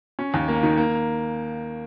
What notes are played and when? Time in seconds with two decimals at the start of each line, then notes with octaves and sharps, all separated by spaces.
0.19 C#4
0.34 D#2
0.48 A#3
0.63 D#3
0.77 A#3